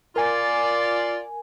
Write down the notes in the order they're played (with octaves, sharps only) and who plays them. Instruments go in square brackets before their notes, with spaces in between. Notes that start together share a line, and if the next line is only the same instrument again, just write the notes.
[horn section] F4 D5 [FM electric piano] A#4 G#5